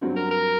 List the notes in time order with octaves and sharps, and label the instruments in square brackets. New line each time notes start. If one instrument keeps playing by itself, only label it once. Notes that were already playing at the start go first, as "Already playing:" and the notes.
[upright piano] G2 F#3 C4 F#4
[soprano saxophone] A#4
A#4